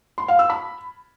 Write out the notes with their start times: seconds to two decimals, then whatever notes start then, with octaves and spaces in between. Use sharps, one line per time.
0.18 C6
0.28 F5
0.39 E6
0.50 B5